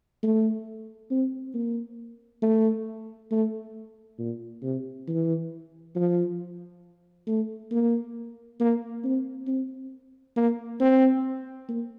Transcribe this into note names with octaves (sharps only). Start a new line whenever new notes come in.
A3
C4
A#3
A3
A3
A#2
C3
E3
F3
A3
A#3
A#3
C4
C4
A#3
C4
A#3